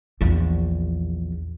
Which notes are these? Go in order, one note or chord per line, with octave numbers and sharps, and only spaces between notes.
A#1 E2